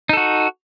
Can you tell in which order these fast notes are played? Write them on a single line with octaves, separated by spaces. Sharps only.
D#4 A4 F#4